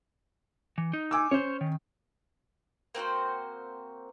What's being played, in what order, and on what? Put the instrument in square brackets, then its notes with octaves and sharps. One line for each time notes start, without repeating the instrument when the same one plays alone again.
[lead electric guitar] E3
D#4
[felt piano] G#5 D6 E6
[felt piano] C#4 [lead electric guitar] C5 C#5
[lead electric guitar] D#3
[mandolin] A#3 C4 F#4 C5